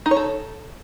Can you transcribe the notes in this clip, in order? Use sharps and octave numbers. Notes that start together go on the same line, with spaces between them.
D#4
C#5
A4